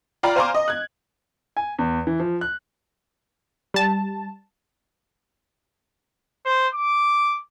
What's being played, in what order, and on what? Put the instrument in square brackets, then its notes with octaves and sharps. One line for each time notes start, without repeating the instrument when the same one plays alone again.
[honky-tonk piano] F4 D5 F5 G5 A#5 B5
C5 F5 G#5 A#5 C6 D6
D#5
F#6 G#6
[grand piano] G#5
E2
E3
F3
F#6
[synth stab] G3 A5
[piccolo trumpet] C5
D6